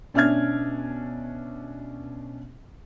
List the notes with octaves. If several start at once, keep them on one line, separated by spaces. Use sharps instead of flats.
B2 C#4 D4 E5 F6 G#6